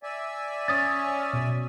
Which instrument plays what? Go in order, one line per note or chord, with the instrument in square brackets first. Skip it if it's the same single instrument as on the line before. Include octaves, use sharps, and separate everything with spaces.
[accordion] D5 E5 G#5
[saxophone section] C#4 [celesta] D#6 A6
[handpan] B2